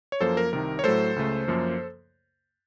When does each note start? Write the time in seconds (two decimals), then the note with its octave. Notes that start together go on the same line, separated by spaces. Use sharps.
0.12 C#5
0.21 F#2 F3 A#3 A4 C5
0.37 A#4
0.52 C2 C3 D#3 A#4
0.79 C#5
0.84 A2 F#3 A3 A4 C5
1.16 C#2 C#3 A3
1.48 F#2 F3 A#3